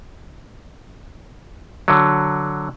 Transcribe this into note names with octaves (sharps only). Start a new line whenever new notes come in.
D3 F#3